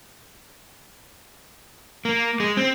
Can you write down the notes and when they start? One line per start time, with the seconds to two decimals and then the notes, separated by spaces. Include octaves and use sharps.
2.05 A#3
2.40 G#3
2.57 C4